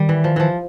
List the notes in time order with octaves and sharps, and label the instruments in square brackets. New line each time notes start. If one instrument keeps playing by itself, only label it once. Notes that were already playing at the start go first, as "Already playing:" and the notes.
Already playing: [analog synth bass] D#3 [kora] G3
[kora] E3
F3
E3 F3